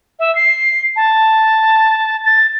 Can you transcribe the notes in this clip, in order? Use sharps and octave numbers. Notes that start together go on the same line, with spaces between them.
E5
C7
A5
A6